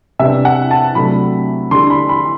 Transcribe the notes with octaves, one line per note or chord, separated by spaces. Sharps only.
C3 G3 B3 D4 E5
F#5
A5
C3 F#3 A3 D4 B5
D3 G3 D4 C6
B5
B5